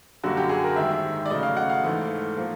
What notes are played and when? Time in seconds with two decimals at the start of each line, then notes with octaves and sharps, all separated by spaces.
0.24 F#2 D3 G3 A#3 F#4
0.37 G4
0.49 G#4
0.64 A#4
0.76 G#2 D#3 G3 E5
1.26 D5
1.30 C#3 F#3 A3 D#5
1.43 F5
1.57 F#5
1.70 F5
1.84 G#2 E3 A3
2.38 F3 A#3